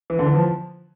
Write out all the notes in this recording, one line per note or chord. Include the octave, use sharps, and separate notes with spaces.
E3
D3
E3
F3